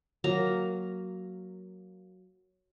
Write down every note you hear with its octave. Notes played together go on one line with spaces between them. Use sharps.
F#3 A#3 A#5